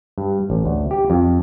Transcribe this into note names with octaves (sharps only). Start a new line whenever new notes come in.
G2
A1
D2
G4
F2